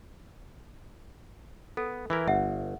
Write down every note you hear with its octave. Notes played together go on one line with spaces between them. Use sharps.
B3 A4
E3 E4 A#4
G1 E5 F#5